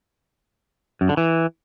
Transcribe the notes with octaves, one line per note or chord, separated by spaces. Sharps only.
F#2
D3
E3